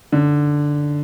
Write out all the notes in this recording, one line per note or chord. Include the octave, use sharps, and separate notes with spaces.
D3